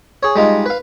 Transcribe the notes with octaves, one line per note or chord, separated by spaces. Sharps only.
G#4 C#5
G3 G#3 D#4 F4
B4 F5